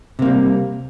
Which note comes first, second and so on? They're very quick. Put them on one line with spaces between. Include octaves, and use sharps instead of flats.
C3 A#3 G3